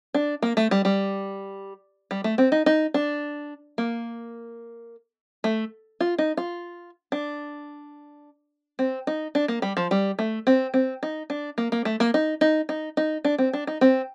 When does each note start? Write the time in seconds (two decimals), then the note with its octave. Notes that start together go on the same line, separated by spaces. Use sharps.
0.14 D4
0.42 A#3
0.57 A3
0.71 G3
0.85 G3
2.11 G3
2.24 A3
2.38 C4
2.52 D#4
2.66 D#4
2.94 D4
3.78 A#3
5.44 A3
6.00 F4
6.18 D#4
6.37 F4
7.12 D4
8.79 C4
9.07 D#4
9.35 D4
9.48 A#3
9.62 G3
9.77 F3
9.91 G3
10.19 A3
10.47 C4
10.74 C4
11.03 D#4
11.30 D4
11.58 A#3
11.72 A#3
11.85 A3
12.00 A#3
12.14 D#4
12.41 D#4
12.69 D#4
12.97 D#4
13.25 D4
13.38 C4
13.53 D4
13.67 D#4
13.81 C4